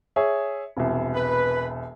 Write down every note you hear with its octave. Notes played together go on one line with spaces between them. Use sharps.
G#4 C#5 E5
E1 C2
B4